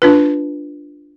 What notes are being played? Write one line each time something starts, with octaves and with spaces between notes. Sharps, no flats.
D4 F4 B4